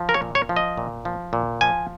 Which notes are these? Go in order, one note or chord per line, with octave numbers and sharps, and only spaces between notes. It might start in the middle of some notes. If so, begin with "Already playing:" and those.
Already playing: F3
A#4
C#5
A#2
C#5
F3
D#5
A#2
F3
A#2
F3 G#5